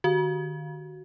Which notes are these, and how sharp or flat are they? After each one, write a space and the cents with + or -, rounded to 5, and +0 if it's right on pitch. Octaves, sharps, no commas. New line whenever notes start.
D#3 -35 F#4 +0